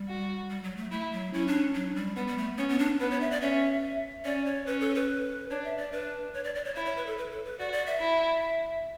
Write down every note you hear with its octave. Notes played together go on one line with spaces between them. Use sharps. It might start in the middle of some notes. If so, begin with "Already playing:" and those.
Already playing: G3
F#4
G3
F#3
A3
A3 E4
F#3
C#4 E4
D4
F#3
G3
G3 B3
G3
A3
B3 C#4
B3
D4
B3 B4
C#5
E5
D5
C#4 E5
C#4 D5
C#5
C#4 B4
A4
B4
D4 C#5
E5
D5
D4 B4
C#5
D5
D5
C#5
E4 C#5
C#5
B4
A4
B4
A4
B4
F#4 D5
D5
E5
E4